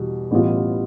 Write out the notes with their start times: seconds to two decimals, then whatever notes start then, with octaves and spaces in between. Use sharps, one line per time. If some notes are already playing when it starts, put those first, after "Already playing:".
Already playing: E2 B2 G3
0.31 A1 A2 G3 B3 F4